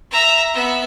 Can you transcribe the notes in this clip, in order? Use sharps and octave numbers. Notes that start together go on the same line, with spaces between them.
E5 A#5
B3 E5